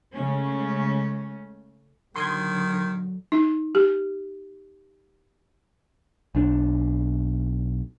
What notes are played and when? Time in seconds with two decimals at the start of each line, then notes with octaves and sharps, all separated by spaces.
0.13 C#3 G#3 A3 C#4
2.16 A#2 D3 D#3 F#3 C6 D#6 G#6
3.32 D#4
3.75 G4
6.35 B1 D4